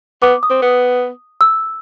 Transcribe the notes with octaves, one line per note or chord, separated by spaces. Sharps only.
B3 D6
D#6
C4
B3
E6